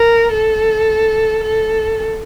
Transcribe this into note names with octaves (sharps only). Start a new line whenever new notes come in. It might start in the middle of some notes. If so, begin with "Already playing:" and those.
Already playing: A#4
A4
A4